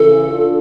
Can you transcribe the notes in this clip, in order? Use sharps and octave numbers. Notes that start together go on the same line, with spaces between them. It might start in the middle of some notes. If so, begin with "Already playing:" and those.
Already playing: F2 C#3 E3 A4
D4 F4